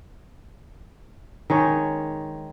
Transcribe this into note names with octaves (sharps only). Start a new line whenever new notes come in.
D#3 G#3 C#5